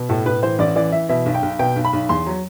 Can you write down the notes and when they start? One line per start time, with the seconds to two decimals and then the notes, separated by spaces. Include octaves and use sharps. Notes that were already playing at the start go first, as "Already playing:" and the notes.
Already playing: B2
0.09 A2 A4
0.26 A2 B4
0.42 E3 C5
0.59 A1 D5
0.76 E3 D5
0.92 E3 E5
1.09 B2 E5
1.26 B1
1.34 G5
1.43 B1
1.59 B2 G5
1.76 B1
1.85 B5
1.93 B1
2.09 E2 C6
2.26 F#3